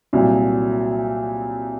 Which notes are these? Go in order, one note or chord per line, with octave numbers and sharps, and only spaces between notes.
C2 A#2 F#3